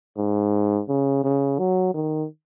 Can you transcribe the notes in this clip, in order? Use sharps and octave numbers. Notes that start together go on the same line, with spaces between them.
G#2
C#3
C#3
F#3
D#3